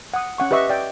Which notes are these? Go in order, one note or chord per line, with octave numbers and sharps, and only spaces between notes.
F#5 D#6
C#4 F#5 C#6
G4 B4 D#5 E5 C#6
D5 G5